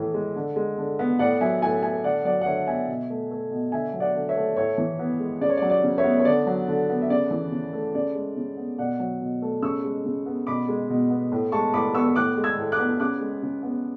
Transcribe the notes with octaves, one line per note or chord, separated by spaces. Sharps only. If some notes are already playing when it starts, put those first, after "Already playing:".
Already playing: A2 E3
G#3
D3
G#3
D3
B3
A2 D5 F#5
F#3 E5 G#5
A2 E5 G#5
A3 E5 G#5
D3 D5 F#5
F#3 D5 F#5
F#5
D3 C#5 E5
B3 E5 G#5
B2
A3
A3
B2
D3 E5 G#5
F#3
D5 F#5
D3
C#5 E5
A3
A2 C#5 E5
E3
B3
G#3
C#3 D5
C#5
D5
F#3
D5
C#3
C#5 E5
B3
C#5
D3 D5
F#3
D3
B3
E5
C#3 D5
E3
C#3
A3
C#3 D5
G#3
C#3
B3
B2 D5 F#5
F#3
B2
A3
C#3 C#6 E6
G#3
C#3
B3
B2 B5 D6
G#3
B2
B3
A2
G#3 A5 C#6
A2 B5 D6
B3 C#6 E6
A2 D6 F#6
G#3
E6 G#6
A2
D6 F#6
B3
C#3 D6 F#6
G#3
C#3
B3